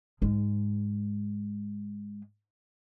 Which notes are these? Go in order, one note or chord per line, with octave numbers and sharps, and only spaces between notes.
G#2 G#3